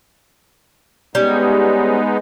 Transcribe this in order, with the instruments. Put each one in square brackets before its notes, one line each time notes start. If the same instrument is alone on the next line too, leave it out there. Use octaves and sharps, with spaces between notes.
[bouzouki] G3 C#4 [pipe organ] G#3 B3 D#4